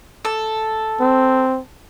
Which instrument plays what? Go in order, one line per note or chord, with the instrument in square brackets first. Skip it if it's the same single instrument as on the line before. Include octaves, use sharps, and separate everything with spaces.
[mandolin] A4
[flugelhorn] C4